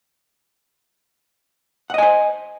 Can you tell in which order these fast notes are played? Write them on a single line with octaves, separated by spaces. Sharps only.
F#5 D#5 G#5 C5